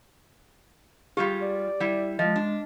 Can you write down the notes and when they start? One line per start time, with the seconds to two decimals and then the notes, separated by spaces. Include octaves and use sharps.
1.17 G3 G#3 F4 G4
1.42 D5
1.80 G3 E4
2.19 F3 G#3 D#5
2.36 D4